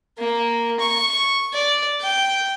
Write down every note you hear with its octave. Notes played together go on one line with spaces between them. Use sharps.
A#3
C#6
D5
G5